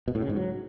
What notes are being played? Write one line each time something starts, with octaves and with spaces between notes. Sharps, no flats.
B2
A2
C#3
G#2
F#3